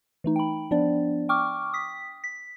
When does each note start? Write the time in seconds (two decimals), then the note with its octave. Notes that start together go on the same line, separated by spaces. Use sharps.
0.24 E3 A3 D#4
0.36 G5 B5
0.71 F3 B3 D4 D5
1.29 G5 C#6 D6 F6
1.73 D#6 B6
2.24 B6